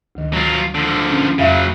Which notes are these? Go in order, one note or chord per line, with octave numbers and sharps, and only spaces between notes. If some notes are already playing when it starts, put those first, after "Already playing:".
D2 D#3
F#3 F4
D3 F3
C#4
F2 C#3 F#3 E5 F5